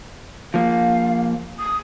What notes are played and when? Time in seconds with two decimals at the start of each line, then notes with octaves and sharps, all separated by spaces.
0.54 F3 A#3 F5
1.59 D#6